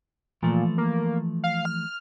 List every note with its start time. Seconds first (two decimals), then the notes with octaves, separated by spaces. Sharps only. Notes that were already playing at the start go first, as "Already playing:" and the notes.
0.43 A#2 E3 F3 A3
0.78 A#3
1.44 F5
1.65 F6